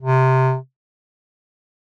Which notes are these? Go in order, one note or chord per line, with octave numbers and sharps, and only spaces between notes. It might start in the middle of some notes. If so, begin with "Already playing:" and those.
C3